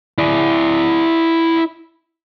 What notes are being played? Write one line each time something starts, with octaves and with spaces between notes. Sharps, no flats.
E4 D5